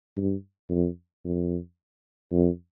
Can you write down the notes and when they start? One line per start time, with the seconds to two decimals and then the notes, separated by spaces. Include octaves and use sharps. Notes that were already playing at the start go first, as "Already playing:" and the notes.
0.17 G2
0.70 F2
1.25 F2
2.32 F2